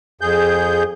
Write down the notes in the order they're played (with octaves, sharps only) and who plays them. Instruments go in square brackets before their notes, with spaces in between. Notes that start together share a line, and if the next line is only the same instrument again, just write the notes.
[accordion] F2 G#4 G6